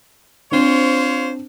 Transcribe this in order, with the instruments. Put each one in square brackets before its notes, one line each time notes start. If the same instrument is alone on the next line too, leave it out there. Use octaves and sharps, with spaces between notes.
[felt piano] C4 D4 [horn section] F4 C5 C#5